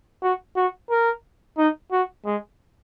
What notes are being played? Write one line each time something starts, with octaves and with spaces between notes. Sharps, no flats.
F#4
F#4
A#4
D#4
F#4
G#3